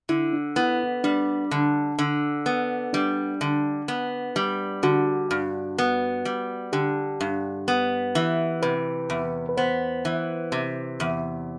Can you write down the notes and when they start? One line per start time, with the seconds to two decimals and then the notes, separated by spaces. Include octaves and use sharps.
0.09 D3 E4
0.33 D4
0.56 B3 E4
1.04 G3 D4
1.51 D3
1.99 D3
2.46 B3
2.93 G3 D4
3.41 D3
3.88 B3
4.36 G3
4.83 D3 F#4
5.31 G2
5.78 B3
6.25 G3
6.73 D3 G4
7.21 G2
7.68 B3
8.15 E3
8.63 C3 B4
9.10 E2
9.49 B4
9.57 B3 C5
10.05 E3
10.52 C3
11.00 E2